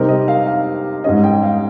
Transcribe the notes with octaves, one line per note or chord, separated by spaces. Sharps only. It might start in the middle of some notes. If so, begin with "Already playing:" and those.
Already playing: C3 G3 C4 D#4 A#4
D#5
F5
F5
G#2 G3 C#4 D#5
G5
F5